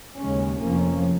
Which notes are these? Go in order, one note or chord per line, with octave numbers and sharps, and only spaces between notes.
D#2 C#3 G#3 C#4
F1 F2 F3 A#3 C#4